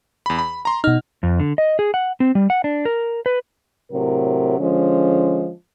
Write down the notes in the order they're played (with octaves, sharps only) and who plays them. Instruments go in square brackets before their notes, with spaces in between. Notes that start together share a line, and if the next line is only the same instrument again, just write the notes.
[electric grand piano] E2 B5
B5
A#5 C6
[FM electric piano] B2 D#4 [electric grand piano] F6
[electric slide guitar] F2
D3
D#5
G#4
F#5
C4
G3
F#5
D4
A#4
B4
[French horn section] A2 C3 F#3 A#4
D3 F3 G#3 C#4